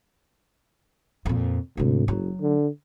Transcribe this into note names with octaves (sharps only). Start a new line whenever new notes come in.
F2 A#2
D2 G#2 C3
F#1 F#3
D3